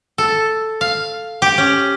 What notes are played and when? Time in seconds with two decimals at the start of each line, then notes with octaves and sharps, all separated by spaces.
0.18 A4
0.81 F5
1.42 G4
1.58 C#4